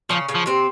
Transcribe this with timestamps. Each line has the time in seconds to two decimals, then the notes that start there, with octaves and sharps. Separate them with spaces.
0.09 C#3 F3 C#4
0.29 C#3 C#4
0.35 F3
0.46 C3 C4